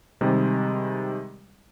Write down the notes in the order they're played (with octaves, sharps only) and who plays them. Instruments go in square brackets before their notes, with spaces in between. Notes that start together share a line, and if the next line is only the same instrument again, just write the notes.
[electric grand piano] C3 D#3 G3 G#3